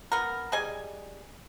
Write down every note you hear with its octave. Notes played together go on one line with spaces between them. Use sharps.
B3 A#4
G3 G#4 D#5 G#5